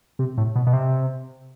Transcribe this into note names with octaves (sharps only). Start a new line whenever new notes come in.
C3
A2
B2
B2
C3